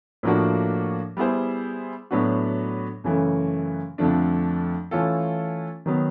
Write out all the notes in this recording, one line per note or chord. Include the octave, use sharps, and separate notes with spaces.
A2 F3 A#3 D4 F#4
G3 B3 E4 G#4 C5
A2 F#3 B3 D4 F#4
F#2 C#3 E3 A3
F2 D3 F3 A3 D4
E3 A3 C#4 F4 A4
D#3 F#3 B3